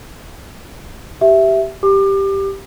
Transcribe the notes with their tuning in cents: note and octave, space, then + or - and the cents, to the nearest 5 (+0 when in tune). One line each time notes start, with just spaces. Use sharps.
G4 -15 E5 +0
G4 +0 D6 +30